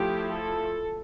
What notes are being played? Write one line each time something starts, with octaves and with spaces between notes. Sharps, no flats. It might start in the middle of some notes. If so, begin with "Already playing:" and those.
Already playing: F3 A3 E4 G4
A4